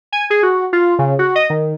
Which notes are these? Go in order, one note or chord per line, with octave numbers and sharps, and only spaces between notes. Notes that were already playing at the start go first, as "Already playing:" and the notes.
G#5
G#4
F#4
F4
C#3
F#4
D#5
D#3